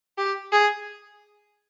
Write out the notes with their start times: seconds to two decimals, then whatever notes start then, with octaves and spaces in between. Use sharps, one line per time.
0.18 G4
0.52 G#4